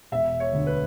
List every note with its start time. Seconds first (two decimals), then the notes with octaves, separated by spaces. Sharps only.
0.12 E1 E5
0.40 C#5
0.53 D2 D3
0.67 B4